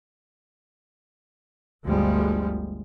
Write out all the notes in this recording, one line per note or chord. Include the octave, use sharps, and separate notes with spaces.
G1 D2 F3 G3 G#3